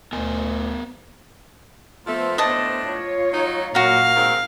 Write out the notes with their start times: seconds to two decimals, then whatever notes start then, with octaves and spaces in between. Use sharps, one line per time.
0.13 D2 B3 A#4 G#5
2.06 F3 A3 B3 A4 C5
2.38 A2 A3 D4 D#5 A5
2.82 F4 C#5
3.31 F#3 D#4
3.75 F#2 A#2 F#4 A#4 F5
4.15 D#3 G#3 C4